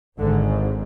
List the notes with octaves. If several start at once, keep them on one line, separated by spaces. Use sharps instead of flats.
G#1 G#2 D3